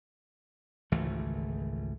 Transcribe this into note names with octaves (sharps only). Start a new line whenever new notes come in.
G#1 C#2 E3 A3